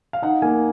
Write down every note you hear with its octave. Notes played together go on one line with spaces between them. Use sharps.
F5
D#4 F#5
A#3 G#5